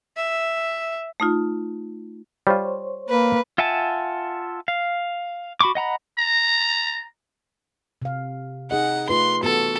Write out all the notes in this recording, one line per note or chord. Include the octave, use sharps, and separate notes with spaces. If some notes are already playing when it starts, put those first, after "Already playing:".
E5
A3 D#4 F4
G3 F4 C5 C#5
A#3 B4
F4 E5 F#5 G#5 A5
F5
F#4 B5 C#6 D6
D#5 F#5 A#5 B5
A#5
C3 F5
D#4 G#4 D#5 F#5
A3 F4 B4 C6
E3 B3 F#4 A4